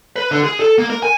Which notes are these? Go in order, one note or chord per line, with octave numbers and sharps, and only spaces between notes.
B4
D3
G#4
A4
A#3
A#4
G#5